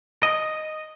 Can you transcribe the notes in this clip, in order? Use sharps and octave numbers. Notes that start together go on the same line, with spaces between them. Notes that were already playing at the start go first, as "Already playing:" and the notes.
D#5